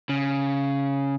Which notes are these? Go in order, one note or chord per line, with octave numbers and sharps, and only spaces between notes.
C#3